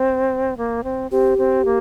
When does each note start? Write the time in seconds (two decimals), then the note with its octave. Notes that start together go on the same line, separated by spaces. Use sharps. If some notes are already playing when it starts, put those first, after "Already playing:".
Already playing: C4
0.57 A#3
0.84 C4
1.11 C4 G4
1.38 C4
1.65 A#3